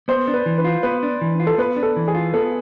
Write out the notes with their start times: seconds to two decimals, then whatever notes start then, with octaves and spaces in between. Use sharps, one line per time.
0.08 B3 C5
0.28 D4
0.34 B4
0.46 E3
0.58 B4
0.64 F4
0.83 B3 B4
1.03 D4
1.21 E3
1.40 F4
1.47 A4
1.58 B3 B4
1.76 D4
1.83 A4
1.96 E3
2.08 G#4
2.15 F4
2.34 B3 A4